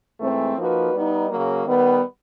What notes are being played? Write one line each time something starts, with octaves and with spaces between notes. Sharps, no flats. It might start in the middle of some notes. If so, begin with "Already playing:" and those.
G#2 E3 A3 C4
F3 A#3 D#4 F#4 B4
G3 B3 D#4
C#3 F#3 A#3
D#3 G3 B3